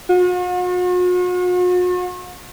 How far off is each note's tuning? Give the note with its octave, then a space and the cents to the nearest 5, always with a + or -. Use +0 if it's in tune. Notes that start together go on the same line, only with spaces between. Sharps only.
F#4 -45